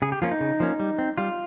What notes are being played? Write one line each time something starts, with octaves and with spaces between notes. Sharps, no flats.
C#3 G#4
G4
F3 A#3 C#4 F4
D#4
C#3
F3 A#3 C#4
G3
C4
G3 F4